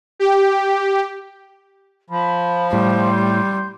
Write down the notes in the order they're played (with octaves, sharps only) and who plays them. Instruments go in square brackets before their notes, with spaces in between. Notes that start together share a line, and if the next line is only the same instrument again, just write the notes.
[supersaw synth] G4
[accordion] F3 [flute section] B5
[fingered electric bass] A2 [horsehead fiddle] G3 [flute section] C6 G6